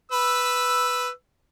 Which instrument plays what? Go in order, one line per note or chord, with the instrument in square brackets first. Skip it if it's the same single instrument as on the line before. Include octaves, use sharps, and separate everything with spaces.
[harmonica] B4 E6